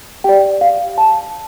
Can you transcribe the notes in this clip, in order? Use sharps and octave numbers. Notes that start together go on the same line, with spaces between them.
G4 D5 G5
F5
A5